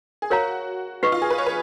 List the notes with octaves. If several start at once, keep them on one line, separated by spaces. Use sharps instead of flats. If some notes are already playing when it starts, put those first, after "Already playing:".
G#4
F#4 A#4 C#5 F5 A#5
D#4 F#4 B4 F#5 C#6
F4
G#4
B4
C#5
B4